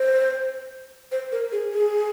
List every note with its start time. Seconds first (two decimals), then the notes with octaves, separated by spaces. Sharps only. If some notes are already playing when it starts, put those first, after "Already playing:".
Already playing: C5
1.12 C5
1.32 A#4
1.52 G#4
1.72 G#4